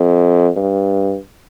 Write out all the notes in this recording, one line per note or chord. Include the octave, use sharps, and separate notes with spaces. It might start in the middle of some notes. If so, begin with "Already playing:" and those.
Already playing: F2
G2